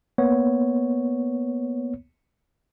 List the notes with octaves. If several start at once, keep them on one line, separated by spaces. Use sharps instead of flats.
A#3 B3 C#5